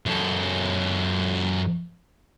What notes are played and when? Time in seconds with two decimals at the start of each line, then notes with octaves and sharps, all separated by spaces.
0.06 F#2 A4